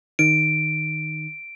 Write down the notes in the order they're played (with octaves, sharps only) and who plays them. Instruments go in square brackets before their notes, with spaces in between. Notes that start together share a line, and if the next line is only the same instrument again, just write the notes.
[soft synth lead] D#3 [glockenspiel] D7